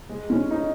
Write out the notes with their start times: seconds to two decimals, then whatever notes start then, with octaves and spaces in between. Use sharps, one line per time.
0.09 G#3
0.30 C#4
0.51 D#4